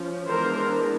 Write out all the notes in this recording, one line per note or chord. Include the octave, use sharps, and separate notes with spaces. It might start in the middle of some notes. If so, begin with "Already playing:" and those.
Already playing: F3 C#4
E3 G#3 B3 D4 A#4 C5